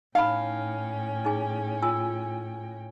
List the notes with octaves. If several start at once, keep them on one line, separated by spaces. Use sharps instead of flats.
A2 C#4 D#4 F5 G5 B5
D#4 G#4 G#5
F4 G#5 E6